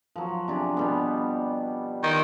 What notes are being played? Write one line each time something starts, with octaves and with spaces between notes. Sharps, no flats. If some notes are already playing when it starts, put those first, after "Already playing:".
F3 F#3
C3 D4 G#4
B2 G3 B3
D#3